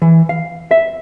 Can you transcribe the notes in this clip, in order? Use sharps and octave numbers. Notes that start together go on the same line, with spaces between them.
E3
F5
E5